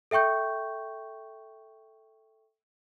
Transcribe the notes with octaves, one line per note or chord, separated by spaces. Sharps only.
A4 E5 G5 C#6 G6